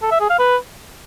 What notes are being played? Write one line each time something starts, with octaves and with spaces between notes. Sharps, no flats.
A4
E5
G#4
F5
B4